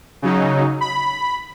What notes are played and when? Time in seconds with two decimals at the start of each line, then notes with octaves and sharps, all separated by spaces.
0.22 C#3 F#3 D#4
0.81 B5